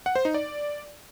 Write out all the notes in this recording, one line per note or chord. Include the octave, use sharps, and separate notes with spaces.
F#5
C5
D#4
D5